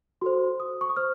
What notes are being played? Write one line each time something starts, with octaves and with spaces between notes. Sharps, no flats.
F#4 A4 C5 C6
D#6
C#6
D#6
C5 F6